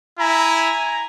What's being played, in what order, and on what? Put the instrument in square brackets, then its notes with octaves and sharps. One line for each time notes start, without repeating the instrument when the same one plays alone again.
[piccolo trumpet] E4 [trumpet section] G#5 A#5